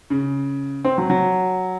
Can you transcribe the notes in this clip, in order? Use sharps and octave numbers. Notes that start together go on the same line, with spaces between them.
C#3
C4
F#3
F#3